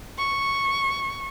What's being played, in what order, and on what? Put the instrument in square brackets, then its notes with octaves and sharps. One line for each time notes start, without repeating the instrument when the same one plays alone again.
[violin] C#6